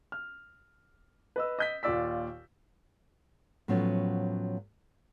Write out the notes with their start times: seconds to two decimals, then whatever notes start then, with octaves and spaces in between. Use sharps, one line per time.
0.12 F6
1.36 B4 D#5 E6
1.59 D#5 G6 B6
1.83 D#2 A#2 F4 D5 E6 B6
3.68 A2 F3 F#3 B3 C#4 F4